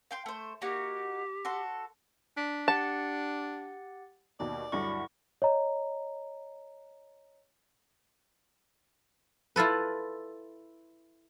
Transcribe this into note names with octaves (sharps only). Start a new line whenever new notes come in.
F5 G5 C6
A3 C5
A#3 D#4 F#4 G4
F#4 A4 C6
D4 B6
G4 F#5 A5 A6
D#2 B2 D5
D2 G2 F#3 E4 C#6
C#5 D#5 A#5
E4 F4 A4 B4